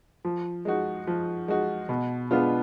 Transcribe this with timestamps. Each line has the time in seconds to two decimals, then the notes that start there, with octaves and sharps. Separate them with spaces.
0.25 F3
0.65 G#3 D#4 F#4
1.07 F3
1.48 G#3 D#4 F#4
1.89 B2
2.31 G#3 B3 D4 F4